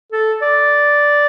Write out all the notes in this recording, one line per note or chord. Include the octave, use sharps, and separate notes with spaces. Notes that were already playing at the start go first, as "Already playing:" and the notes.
A4
D5